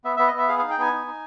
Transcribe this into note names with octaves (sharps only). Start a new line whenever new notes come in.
B3 E5
B3 E5
D#5
B3 E5
G#4 F5
D#4 F5
G5
B3 G#5
D#4
D#4